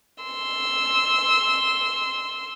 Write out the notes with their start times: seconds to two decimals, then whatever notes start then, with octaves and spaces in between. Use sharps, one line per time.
0.24 C6 E6